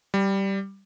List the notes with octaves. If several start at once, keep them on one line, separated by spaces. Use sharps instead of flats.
G3